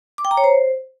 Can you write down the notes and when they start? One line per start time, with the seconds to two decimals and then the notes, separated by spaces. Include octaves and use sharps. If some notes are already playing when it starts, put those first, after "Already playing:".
0.18 D6
0.25 G5
0.31 A#5
0.37 C#5
0.44 C5